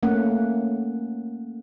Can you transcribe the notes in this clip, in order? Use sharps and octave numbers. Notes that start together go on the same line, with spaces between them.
A3 A#3 C#4 F#5